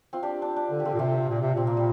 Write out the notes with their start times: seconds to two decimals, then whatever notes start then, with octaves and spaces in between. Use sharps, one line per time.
0.13 C4 F4
0.23 D4 G4
0.42 D4
0.56 D4
0.71 D3
0.80 G4
0.85 D3 C4 F4
0.94 A#2
0.99 C3 C4 F4
1.29 A#2
1.41 C3
1.54 A#2 C4
1.67 A#3
1.77 G3